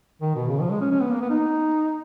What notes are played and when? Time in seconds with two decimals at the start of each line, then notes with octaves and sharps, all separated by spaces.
0.21 D#3
0.35 B2
0.48 C#3
0.61 F3
0.70 G#3
0.81 C#4
0.91 C#4
1.00 B3
1.10 A#3
1.21 B3
1.30 D#4